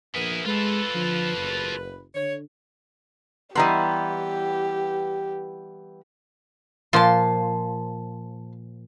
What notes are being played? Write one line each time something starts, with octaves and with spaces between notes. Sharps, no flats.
A#1 B3 E4 G#4 A#4 B4
G#3 A3 F4 A4 B4
D3 F3
F#1
D3 C#5
E3 G3 B3 G4 D#5 A#5 C6
A#2 F3 A5 C6